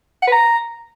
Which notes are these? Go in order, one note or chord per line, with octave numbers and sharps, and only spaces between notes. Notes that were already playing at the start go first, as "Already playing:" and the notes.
F#5
B4
A#5